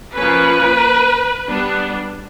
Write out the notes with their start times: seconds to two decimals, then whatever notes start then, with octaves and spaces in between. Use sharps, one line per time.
0.15 F3 A#3 C#4 B4
1.45 G3 B3 D4